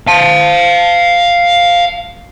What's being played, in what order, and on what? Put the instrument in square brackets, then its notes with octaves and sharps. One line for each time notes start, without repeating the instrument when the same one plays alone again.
[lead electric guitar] F5 A5